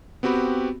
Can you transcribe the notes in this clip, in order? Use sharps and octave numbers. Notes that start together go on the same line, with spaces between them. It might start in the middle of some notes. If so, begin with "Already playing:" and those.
B3 C4 F#4 G4 B5